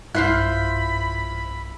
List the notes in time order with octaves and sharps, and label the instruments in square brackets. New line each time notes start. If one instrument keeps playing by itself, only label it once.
[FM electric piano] B1 G2 [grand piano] E4 [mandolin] F4 C5 F#6 [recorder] B5